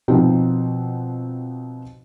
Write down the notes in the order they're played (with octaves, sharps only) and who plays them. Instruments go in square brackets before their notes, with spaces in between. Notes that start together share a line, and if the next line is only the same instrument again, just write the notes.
[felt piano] B2 F3 C4 D#4 F#4